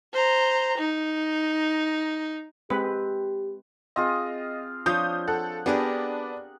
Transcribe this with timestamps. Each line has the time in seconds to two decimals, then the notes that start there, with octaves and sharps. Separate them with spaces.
0.13 C5 A#5
0.78 D#4
2.70 G#3 C4 G4 B4
3.96 C4 F4 G#4 D#5
4.86 F3 D4 C#5 D#6 G6
5.28 A4 F#5
5.66 B3 D4 G4 G#4 A#4